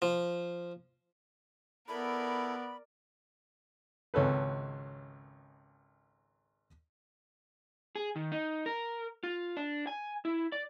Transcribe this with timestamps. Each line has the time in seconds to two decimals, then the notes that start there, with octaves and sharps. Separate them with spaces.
0.02 F3
1.88 B3 E4 A4 A#4 D5 B5
4.14 G#1 C#2 C#4 A4 B4
7.95 G#4
8.16 D#3
8.32 D#4
8.66 A#4
9.23 F4
9.57 D4
9.87 G#5
10.25 E4
10.52 D5